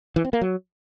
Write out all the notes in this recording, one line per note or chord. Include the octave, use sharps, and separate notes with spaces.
E3
C4
A#3
F#3